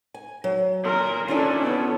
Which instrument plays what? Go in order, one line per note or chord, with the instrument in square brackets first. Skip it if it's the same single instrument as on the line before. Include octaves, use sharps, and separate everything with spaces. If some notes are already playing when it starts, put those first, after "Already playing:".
[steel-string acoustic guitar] G#5
F#3
[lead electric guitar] A#2 C6 [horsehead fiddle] A#4
[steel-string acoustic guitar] D#3 E4 D5 [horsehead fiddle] C#4 A4 [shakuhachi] D4 [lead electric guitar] F4 G#5
[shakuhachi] B3